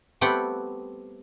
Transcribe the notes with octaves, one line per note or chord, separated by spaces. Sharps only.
G3 A3 B3 C4 F#5 G5